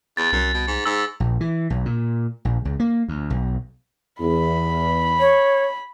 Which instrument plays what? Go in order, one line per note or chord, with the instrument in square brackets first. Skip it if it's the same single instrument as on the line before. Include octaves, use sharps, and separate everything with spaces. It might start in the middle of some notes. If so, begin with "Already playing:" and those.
[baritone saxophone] E2 [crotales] A6
[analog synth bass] C2 [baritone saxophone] F#2
[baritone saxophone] B2
G#2
[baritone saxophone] G#2 [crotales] E6
[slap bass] A#1
E3
B1
A#2
A#1
C#2
A#3
D2
B1
[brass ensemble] E2 [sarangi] B5
[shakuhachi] C#5